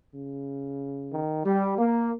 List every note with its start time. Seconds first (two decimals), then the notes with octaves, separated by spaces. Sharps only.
0.12 C#3
1.11 D#3
1.45 G3
1.78 A#3